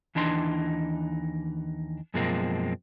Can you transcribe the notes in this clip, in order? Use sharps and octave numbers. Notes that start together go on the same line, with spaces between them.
D#2 E3 D4 D#4 C6
F#2 B2 F3 G#3 A#3 C4